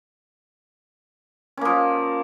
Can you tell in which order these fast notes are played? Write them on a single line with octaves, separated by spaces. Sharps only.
C#4 A#3 F3